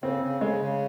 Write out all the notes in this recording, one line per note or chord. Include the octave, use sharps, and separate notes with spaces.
C#3 C4
C#3
C#3 G#3
C#3